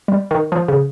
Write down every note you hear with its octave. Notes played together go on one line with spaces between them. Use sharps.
G3
D#3
F3
C#3